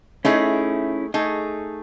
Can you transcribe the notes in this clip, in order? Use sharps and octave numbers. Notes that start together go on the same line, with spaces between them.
A3 C#4 D#4 E4 G#4
A3 D#4 G#4